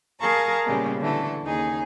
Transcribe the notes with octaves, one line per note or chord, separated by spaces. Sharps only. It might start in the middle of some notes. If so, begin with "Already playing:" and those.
G#4 A#4 F5 A5 A#5 C#6
A#2 C#3 G3 G#3 B3
D3 E3 A3 A4
D#2 C#3 D#4 G#4 G#5